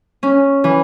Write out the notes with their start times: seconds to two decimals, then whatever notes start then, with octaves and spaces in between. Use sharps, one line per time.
0.23 C#4
0.64 E3